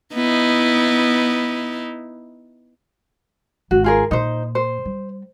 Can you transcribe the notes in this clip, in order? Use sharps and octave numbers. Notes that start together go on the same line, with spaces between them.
B3 D#4 E4
G#1 F#4
F4 G#4 A#4
A#2 D#4 C5
C5
G3